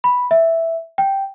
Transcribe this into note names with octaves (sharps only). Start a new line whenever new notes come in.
B5
E5
G5